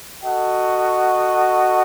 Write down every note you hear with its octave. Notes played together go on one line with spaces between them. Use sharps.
F#4 A4 D#5 F#5